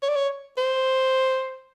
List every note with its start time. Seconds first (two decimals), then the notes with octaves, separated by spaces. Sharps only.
0.03 C#5
0.09 D5
0.16 C#5
0.58 C5